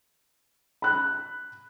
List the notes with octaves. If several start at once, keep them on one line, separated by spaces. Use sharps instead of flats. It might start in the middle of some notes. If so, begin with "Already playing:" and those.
B5 F#6